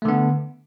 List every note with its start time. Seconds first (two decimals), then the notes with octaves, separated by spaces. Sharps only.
0.02 A3
0.05 D3
0.08 B3